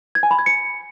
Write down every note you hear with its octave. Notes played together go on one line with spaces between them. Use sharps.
G#6
G#5
B5
G#6
C#7